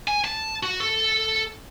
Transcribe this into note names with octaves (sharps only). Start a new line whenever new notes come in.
G#5
A5
F#4
A4